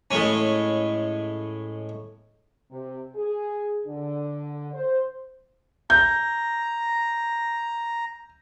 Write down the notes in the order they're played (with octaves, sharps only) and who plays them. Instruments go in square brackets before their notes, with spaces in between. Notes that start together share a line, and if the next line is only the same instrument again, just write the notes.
[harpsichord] A2 G#3 C#4
[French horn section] C3
G#4
D3
C5
[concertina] A#5 [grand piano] G6